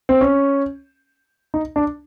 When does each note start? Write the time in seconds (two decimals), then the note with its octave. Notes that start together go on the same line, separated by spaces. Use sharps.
0.09 C4
0.21 C#4
1.54 D#4
1.76 D4